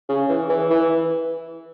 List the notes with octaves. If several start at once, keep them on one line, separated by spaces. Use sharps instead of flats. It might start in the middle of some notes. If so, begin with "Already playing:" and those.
C#3
E3
E3
E3